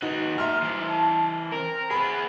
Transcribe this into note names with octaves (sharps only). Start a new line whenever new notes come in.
D#2 D#4 F#4 B4
A#2 E5 A#5 C6 F6
E3 C5
A5
C4 A#4
B3 G#4 B5